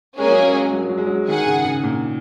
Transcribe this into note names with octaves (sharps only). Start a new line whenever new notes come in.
G#3 A#3 C#4 G#4
F#3
G#3
F#3
G#3
F#3
G#3
F#3
D#3 G#4 F#5
C#3
C#3
A#2